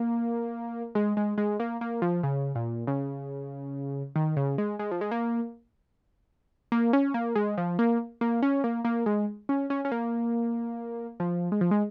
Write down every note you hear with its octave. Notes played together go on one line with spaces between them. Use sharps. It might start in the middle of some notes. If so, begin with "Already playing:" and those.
Already playing: A#3
G#3
G#3
G#3
A#3
A#3
F3
C#3
A#2
C#3
D#3
C#3
G#3
G#3
F3
G#3
A#3
A#3
C#4
A#3
G#3
F3
A#3
A#3
C#4
A#3
A#3
G#3
C#4
C#4
C#4
A#3
F3
G#3
F3
G#3